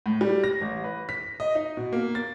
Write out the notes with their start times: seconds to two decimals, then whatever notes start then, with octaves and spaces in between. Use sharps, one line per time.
0.06 A2
0.21 G3
0.44 A#6
0.61 A1
0.84 B4
1.09 B6
1.40 D#5
1.55 D#4
1.77 B2
1.93 A#3
2.15 A6